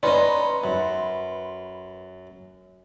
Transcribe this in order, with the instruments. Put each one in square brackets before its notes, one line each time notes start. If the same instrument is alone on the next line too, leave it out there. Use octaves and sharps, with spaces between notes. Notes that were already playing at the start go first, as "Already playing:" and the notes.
[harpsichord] C#4 D#4 D#5 [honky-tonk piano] B4 C6 [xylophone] D5
[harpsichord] F#2